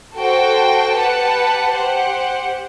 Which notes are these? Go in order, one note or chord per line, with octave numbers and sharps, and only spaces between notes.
F#4 A4 C5 G5
G4 B4 F#5 A5
G4 C5 F#5